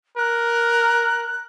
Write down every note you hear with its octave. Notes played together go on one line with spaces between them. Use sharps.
A#4 F#6